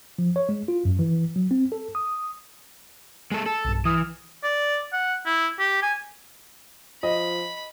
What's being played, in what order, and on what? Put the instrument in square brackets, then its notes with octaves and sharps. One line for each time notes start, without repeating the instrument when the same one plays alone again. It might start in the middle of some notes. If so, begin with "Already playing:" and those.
[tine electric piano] F3
C#5
G#3
F4
F#2
E3
F#3
C4
A4
D#6
[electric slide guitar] G#3 A4
A4
[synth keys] B1 G2
[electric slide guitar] E3 [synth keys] D#6 F6
[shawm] D5
F#5
E4
G4
G#5
[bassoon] F3 [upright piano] D#5 [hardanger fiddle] B5